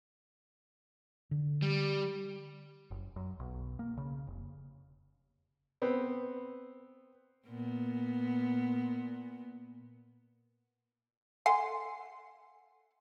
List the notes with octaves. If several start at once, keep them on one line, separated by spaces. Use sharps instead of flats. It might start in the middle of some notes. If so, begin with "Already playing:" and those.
D3
G3
F#1
F#2
B1
A#3
C#3
F1
B3 C4
A#2 B3
A4 F#5 G#5 C6